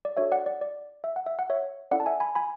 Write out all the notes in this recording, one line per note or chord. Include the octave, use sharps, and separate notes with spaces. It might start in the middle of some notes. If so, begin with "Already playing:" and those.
D5
D4 F#4 A4 C#5 E5
D5 F#5
D5
D5
E5
F#5
E5
F#5
C#5 E5
C#4 E4 A4 D5 F#5
A5
E5 G#5
G#5 B5
G#5 B5